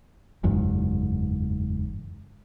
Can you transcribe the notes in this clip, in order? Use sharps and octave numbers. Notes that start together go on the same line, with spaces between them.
F#1 E2 G#2